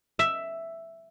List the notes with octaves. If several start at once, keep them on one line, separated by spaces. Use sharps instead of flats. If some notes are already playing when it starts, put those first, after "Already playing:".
E5